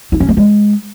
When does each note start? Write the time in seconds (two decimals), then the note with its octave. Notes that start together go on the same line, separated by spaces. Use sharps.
0.12 E4
0.20 C#4
0.29 A3
0.37 G#3